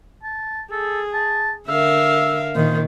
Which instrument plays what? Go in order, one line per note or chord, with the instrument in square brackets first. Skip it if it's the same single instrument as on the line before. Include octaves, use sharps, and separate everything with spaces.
[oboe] A5
[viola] G#4 [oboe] A4
[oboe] A5
[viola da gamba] D3 A#4 [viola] E5 F5 [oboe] E6
[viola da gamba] A#2 D#3 [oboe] C5